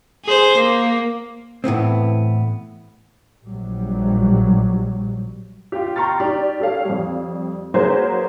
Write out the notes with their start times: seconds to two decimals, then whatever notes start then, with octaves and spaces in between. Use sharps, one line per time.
0.25 G#4 C5
0.57 A#3
1.64 A2 E3 B3 C4
3.45 A#1 F#3 G3
5.72 F4 G4
5.96 G5 A#5 C6 C#6 F6 A6
6.20 D#4 G4 D5
6.60 G4 A4 C#5 F5
6.85 F2 G3
7.74 F#3 A#3 F#4 G#4 B4 C5